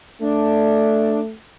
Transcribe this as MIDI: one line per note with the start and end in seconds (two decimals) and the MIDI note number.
0.22 1.35 57
0.22 1.20 62